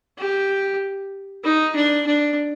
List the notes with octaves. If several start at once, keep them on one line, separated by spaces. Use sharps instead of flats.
G4
D#4
D4
D4